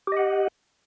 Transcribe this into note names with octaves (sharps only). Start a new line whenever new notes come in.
G4 D#5 F#5